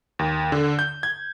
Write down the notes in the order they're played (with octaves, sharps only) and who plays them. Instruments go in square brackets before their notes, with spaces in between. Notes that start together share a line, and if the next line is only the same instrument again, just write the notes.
[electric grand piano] D#2
D3
G6
G#6